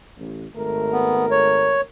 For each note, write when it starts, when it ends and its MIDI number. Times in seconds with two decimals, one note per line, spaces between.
0.18 0.45 33
0.54 1.89 32
0.54 1.89 57
0.54 1.89 70
0.92 1.26 59
1.31 1.81 73